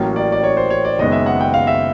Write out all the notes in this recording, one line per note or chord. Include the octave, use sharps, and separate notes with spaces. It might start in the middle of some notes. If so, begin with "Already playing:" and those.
Already playing: A1 A2 F#3 A#3 C#4
D5
D5
C#5
C5
C#5
D5
F#1 F#2 D#3 G#3 B3 D#5
E5
F#5
G5
F5
E5